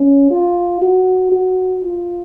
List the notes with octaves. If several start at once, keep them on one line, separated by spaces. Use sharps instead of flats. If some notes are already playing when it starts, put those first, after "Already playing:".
Already playing: C#4
F4
F#4
F#4
F4